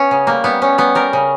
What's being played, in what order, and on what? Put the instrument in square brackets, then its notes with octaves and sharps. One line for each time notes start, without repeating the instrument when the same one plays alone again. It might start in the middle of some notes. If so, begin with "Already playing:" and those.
Already playing: [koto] B3 C#4
C#3
G3 A#3
G3 B3
G3 C#4
G3 B3
G3 A#4
C#3